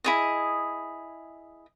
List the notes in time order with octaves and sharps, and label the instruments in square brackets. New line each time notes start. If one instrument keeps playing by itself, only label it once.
[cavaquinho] E4 G#4 D#5